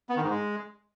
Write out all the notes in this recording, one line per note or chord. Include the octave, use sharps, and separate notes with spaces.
B3
D#3
G#2
G#3